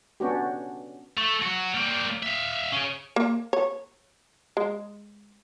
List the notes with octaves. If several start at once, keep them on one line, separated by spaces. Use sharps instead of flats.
B3 C#4 D4 F#4 G4
A3
F#3 F#4
G3 A#3
E5 F5
C#4 G#4
A#3
C#5
G#3